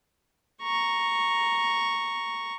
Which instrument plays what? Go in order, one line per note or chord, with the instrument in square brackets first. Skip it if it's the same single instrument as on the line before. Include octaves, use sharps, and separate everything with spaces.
[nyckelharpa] A#5 C#6